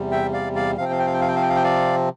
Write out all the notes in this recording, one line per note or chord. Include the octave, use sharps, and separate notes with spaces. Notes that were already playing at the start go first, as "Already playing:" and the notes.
Already playing: E2 C3 G3
E5 G5
D5 F5
D5 F5
C3 F3 C4 F5
G5
F5
G5
F5
G5
F5
G5
F5
G5
F5
G5
D5 F5